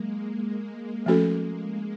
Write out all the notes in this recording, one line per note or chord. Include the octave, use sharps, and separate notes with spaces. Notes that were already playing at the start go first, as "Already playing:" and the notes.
Already playing: F#3 G#3 A#3
G#3 A#3
F3 A3 C#4 F#4 A4